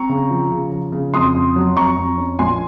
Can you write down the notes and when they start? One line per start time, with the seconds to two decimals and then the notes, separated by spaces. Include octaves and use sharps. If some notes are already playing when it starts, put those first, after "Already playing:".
Already playing: C4 A#5 C#6
0.09 C#3
0.30 F3
0.52 C#3
0.72 F3
0.92 C#3
1.14 F2 C6 D#6
1.35 F2
1.56 F#3
1.76 F2 A#5 C#6
1.97 F2
2.18 C#4
2.39 A#1 G#5 C6